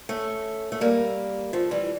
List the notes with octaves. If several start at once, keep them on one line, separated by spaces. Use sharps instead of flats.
A3 C#4
A3
G3 A#3
F3 A3
E3 G3